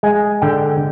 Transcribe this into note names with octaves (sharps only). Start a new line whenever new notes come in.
G#3 G#5
D3 G5